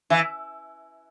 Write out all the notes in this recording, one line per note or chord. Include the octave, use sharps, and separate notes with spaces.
E3